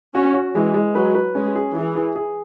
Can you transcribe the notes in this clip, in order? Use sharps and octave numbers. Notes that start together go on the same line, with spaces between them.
C#4 F#4
F#4
E3 G#3
G#3
F#3 B4
B4
G#3 C#4
G#4
E3 G#4
G#4
G#4